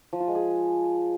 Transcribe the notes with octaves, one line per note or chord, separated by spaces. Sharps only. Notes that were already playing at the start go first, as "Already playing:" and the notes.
F3
F4
G#3
G#4